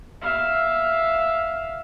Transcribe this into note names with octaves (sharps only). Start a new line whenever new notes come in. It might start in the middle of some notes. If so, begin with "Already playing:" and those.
E5 F5